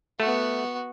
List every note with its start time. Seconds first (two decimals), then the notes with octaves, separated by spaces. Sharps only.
0.20 A3 B3 F#4